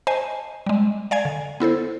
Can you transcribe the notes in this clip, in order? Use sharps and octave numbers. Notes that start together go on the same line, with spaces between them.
C5 D#5 G#5 A5
G3 G#3
D5 F5 G#5 G#6
D3
B3 E4 A4 C5